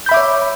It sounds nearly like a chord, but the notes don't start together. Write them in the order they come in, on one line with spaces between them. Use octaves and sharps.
G6 B5 E5 D6 C#5